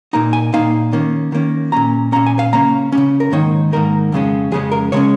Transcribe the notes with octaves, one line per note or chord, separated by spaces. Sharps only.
A#2 A#3 D#4 A#5
G#5
A#2 A#3 D#4 F5
D#3 A#3 C#4
D#3 A#3 C#4
A#2 A#3 C#4 A#5
A#2 A#3 C#4 A#5
G#5
F5
C#3 A#3 C#4 A#5
A#3 C#4
C#3
A#4
G#2 D#3 A#3 D#4 C#5
G#2 D#3 A#3 D#4 A#4
F2 C#3 G#3 C#4
F2 C#3 G#3 C#4 G#4
A#4
C#3 G#3 C#4 C#5